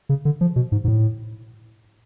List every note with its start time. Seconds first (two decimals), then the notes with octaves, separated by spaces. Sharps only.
0.09 C#3
0.25 D3
0.41 F3
0.56 B2
0.72 G#2
0.84 G#2
0.88 A2